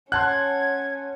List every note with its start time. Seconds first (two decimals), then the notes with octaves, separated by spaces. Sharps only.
0.12 C#4 F#5 A5 C6 F#6 G#6